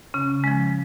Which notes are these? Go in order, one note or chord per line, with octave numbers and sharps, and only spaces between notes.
C#3 C#4
F3 G#3